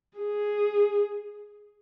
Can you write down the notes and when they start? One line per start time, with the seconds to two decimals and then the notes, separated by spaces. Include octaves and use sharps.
0.18 G#4